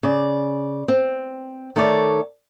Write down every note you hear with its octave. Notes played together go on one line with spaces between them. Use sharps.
C#3 D5
C4
D#3 A3 A4 C#5 D5